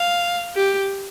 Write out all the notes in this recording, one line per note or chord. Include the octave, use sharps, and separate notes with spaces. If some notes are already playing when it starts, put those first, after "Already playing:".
Already playing: F5
G4